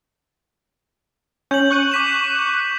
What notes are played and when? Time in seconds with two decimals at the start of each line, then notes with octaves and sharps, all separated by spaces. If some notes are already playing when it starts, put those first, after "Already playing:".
1.51 C#4 G6 F#7
1.71 C#6 F#6 D#7
1.92 D6 B6 E7